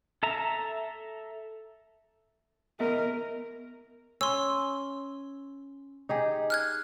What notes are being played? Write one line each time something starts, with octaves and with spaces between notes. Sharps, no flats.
A4 E5 A#5
B3 A#4 D#5 E5
C#4 C6 E6
D#4 G4 G#4
F6 F#6 G#6